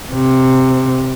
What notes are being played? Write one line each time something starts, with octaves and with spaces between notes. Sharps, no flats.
C3